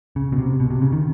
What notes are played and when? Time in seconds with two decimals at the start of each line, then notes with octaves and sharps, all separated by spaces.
0.16 C#3
0.32 B2
0.38 C3
0.60 B2
0.70 C3
0.82 C#3
0.92 D#3